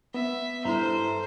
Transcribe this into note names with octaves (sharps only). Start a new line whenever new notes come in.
B3 E5
G2 E4 A4 C5 A#5